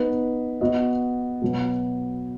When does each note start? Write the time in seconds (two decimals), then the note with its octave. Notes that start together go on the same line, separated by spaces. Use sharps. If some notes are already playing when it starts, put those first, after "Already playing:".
Already playing: B3 D#4 B4 D#5
0.61 B3 F#4 D#5
1.42 B2 F#3 B3